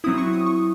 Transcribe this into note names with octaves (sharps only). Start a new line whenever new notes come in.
F#3 C4 E4 D#6
C#6
D#6
C#6